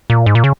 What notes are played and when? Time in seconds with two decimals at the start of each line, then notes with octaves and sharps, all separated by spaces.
0.10 A#2
0.26 G#2
0.35 A#2
0.44 C#3